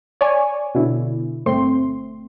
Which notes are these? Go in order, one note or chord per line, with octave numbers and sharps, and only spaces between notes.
C#5 D5 G#5
B2 D3 E4
G1 A3 C4 C6